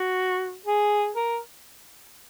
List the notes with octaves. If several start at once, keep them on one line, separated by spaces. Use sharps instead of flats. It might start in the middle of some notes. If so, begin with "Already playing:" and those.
Already playing: F#4
G#4
A#4